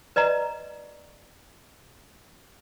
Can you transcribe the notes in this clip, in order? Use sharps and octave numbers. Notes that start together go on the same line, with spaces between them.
B4 D5 D#5 A#5